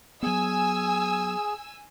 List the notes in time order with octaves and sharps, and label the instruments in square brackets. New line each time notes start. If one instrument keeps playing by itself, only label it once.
[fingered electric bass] F#3 B3 [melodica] G#4 [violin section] G#5 E6